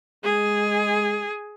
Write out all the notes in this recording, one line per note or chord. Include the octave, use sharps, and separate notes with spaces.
G#3 G#4